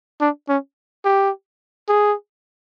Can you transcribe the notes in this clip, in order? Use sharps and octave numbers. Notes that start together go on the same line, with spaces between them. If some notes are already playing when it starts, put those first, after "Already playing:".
D4
C#4
G4
G#4